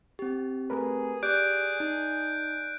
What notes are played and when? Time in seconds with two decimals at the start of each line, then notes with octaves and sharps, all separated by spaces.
0.19 C4 G4
0.70 A3 G#4 A#4 B4
1.23 G4 D5 F#6 G6 D7
1.80 D#4